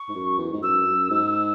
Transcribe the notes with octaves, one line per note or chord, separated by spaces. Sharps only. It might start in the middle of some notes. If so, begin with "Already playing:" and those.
Already playing: C#6
G#2
F#2
E2
G#2
F#2 E6
F#2
G#2